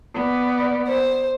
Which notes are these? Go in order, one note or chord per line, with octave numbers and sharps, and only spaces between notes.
B3 D5
C5